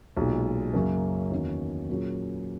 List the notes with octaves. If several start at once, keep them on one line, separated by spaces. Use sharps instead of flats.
B1 A#2 G#3
F#2 C#3 F#3 A#3
E2 D#3 A#3 C#4 F#4
A#2 F#3 A#3 C#4 G#4